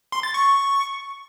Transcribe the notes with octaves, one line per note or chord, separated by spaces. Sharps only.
C6
A6
C#6